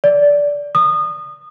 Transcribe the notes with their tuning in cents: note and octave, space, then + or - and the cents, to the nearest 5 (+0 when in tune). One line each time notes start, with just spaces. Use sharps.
D5 -15
D#6 -25